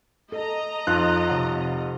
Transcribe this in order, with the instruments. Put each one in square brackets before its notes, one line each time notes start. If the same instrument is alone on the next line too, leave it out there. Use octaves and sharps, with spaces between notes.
[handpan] A4 [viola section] D#5 A#5
[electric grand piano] F2 F4 F#6 [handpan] D#4
[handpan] C3 C#5 F#5